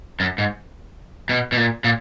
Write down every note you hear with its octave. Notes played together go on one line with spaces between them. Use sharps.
F#2
G#2
B2
B2
A#2
A#2